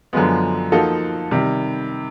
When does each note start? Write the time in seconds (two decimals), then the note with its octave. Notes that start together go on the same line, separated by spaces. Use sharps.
0.13 F#2 D3 F3 G#3 B3
0.72 F3 A#3 D#4 F#4 A4
1.31 C3 D#3 G3